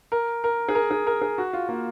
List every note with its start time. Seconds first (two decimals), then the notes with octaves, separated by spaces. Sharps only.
0.12 A#4
0.44 A#4
0.69 G#4
0.75 A#4
0.91 G#4
1.07 A#4
1.21 G#4
1.38 F#4
1.53 F4
1.69 A#3